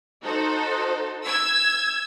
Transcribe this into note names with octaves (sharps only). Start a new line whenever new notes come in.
D#4 F#4 A4 C5
E6 G#6